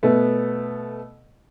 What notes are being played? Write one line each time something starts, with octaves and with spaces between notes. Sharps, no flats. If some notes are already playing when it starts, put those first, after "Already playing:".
B2 A3 B3